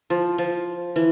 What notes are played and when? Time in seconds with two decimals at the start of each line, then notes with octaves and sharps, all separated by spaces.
0.10 F3
0.38 F3
0.96 E3